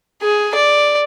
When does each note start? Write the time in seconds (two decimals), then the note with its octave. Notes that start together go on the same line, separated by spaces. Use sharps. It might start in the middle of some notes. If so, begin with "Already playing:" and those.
0.22 G#4
0.55 D5